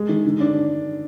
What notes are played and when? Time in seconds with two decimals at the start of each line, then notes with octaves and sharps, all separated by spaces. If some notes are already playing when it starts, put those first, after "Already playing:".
Already playing: G#3
0.09 D#3
0.24 D3
0.40 D4